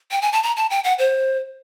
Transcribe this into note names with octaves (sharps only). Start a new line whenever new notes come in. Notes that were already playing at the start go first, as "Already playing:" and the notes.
G5
G#5
A5
A#5
A5
G5
F#5
C5